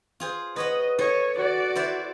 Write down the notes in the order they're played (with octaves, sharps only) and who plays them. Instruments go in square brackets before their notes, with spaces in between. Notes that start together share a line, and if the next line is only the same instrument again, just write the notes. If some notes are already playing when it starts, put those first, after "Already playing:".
[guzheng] F4 G#4 C5
[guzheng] B4 C#5 F#5 [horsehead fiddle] D#5
[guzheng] A4 D#5 [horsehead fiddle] C#5
[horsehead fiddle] F#4 D5
[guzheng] E4 C5 E5